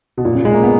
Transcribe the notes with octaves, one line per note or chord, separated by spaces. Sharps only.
B2
A#2
C#3
G#3
A#3
B3